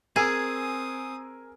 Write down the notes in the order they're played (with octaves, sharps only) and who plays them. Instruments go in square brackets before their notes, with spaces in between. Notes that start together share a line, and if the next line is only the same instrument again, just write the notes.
[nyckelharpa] C4 D#6 [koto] G#4 [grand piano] A#4 G#5 E6